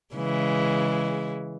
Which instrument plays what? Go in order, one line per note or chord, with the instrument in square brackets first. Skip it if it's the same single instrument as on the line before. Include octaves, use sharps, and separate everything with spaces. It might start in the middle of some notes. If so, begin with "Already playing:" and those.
[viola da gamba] C#3 E3 G#3